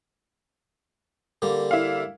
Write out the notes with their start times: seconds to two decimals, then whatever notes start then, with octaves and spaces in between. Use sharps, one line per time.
1.42 D3 G3 A#3
1.71 E4 F5